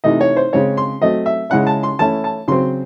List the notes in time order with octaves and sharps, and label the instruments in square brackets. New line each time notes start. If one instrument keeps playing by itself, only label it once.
[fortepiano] C3 E3 A3 D#4 D#5
C#5
C5
C#3 G#3 C4 C#5
C6
F#3 A3 C4 D#5
E5
C#3 G#3 C#4 E4 F#5
A5
C6
E3 A3 C#4 E4 A5
A5
C#3 F#3 C4 C6